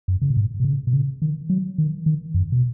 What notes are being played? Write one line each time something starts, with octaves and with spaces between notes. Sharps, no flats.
F#2
C#3
B2
G#2
B2
C#3
B2
C#3
D#3
F#3
D#3
D#3
F#2
B2